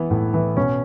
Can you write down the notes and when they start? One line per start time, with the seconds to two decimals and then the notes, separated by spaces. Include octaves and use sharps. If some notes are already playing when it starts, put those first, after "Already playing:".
Already playing: E3 B3
0.11 A2
0.34 E3
0.57 B2 C#4